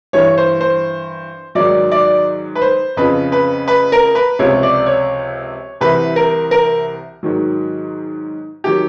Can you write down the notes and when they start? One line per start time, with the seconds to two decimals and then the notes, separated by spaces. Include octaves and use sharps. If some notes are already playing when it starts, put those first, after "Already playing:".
0.13 G2 E3 C#5
0.37 C5
0.61 C5
1.55 G#2 D#3 F#3 D5
1.92 D5
2.55 B4
2.62 C5
2.97 F2 C#3 F3 B4
3.32 B4
3.68 B4
3.92 A#4
4.15 B4
4.39 C#2 C3 F3 C#5
4.63 D5
4.86 C#5
5.80 C2 C3 E3 B4
6.16 A#4
6.51 A#4
7.23 G#2 D#3 F#3
8.64 D#3 F#3 G4